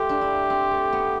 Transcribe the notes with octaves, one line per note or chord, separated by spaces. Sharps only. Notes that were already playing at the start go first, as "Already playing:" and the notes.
Already playing: A3 F4 G4
D4
E4
C4
A3
B3